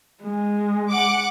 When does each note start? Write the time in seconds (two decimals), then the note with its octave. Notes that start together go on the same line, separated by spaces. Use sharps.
0.23 G#3
0.91 F#5 D6